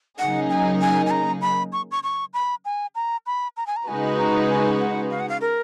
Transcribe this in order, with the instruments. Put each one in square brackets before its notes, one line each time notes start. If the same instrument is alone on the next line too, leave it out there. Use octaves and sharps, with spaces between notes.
[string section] C#3 F#3 A#3 D#4 G#4 [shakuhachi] F#5
[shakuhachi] G#5
G#5
G#5
A#5
B5
C#6
C#6
C#6
B5
G#5
A#5
B5
A#5
G#5
A#5
[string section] C#3 G#3 D#4 F#4 B4 [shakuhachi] G#5
[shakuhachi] A#5
G#5
F#5
F5
F#5
F5
A#4